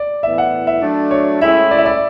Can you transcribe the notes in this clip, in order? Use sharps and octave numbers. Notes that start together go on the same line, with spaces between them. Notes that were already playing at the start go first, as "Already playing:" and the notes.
Already playing: D5
A2 E3 B3 E5
F#5
E5
F#3 A3 D4
C#5
A2 G#3 C#4 E4 E5
D5
E5
D5